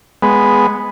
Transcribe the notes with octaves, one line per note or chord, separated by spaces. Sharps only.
G#3 B3